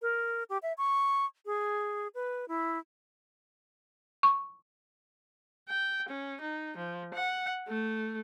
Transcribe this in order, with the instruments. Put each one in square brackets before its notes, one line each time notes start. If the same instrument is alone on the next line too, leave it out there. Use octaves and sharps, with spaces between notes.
[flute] A#4
G4
E5
C#6
G#4
B4
E4
[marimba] C#6
[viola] G5
C#4
D#4
F3
F#5
A3